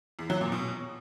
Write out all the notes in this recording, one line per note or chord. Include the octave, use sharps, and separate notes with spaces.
E2
F#3
A#2
B2